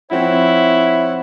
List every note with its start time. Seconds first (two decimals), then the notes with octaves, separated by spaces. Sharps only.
0.11 F3 C4 E4 C#5 F#5